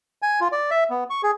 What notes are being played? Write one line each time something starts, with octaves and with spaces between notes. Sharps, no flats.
G#5
F4
D5
E5
B3
C#6
G#4